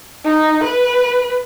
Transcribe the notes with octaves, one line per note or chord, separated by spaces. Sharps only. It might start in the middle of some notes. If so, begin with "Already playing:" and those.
D#4
B4